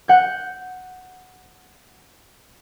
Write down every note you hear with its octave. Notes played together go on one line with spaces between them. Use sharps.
F#5 G6